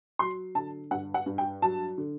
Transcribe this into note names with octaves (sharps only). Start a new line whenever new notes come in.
F#3 C6
D3 A5
G2 F#5
F#5
G2
G5
F#3 A5
D3